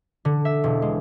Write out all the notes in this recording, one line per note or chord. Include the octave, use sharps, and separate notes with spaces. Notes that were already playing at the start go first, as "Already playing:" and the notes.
D3
E5
E1
G#3